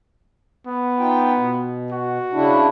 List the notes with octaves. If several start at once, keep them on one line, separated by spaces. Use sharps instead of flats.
B3
D#4 F4 G5
B2
F#4
C#3 D4 E4